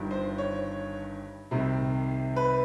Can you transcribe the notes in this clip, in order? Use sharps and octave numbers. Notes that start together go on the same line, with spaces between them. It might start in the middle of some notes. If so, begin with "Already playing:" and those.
Already playing: G1 G2 D#3
C5
C#5
C2 C3 D#3
B4